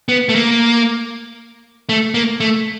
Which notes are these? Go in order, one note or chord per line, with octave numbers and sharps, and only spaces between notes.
B3
A3
A#3
A3
A#3
A3